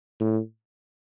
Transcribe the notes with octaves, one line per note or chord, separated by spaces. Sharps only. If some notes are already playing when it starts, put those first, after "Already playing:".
A2